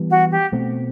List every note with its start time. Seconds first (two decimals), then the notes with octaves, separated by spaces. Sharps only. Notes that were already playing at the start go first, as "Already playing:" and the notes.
Already playing: E3 G3 B3
0.10 F#4
0.31 G4
0.52 B2 A3 C4